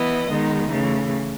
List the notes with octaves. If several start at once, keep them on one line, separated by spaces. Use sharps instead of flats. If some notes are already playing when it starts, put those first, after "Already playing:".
Already playing: E3 B3 E4 B4 D#5
D#3 G#3 B3 D#4
C#3 E3 A3